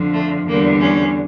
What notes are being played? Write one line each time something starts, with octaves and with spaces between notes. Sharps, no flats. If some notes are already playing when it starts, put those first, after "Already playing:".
Already playing: F2 D3 F3
A3
E2 D3 G3 A#3
C#4